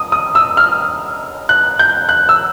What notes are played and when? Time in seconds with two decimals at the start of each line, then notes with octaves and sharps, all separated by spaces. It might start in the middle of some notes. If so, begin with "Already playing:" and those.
Already playing: D#6
0.12 D#6
0.35 E6
0.57 F6
1.49 F#6
1.79 G6
2.09 F#6
2.29 E6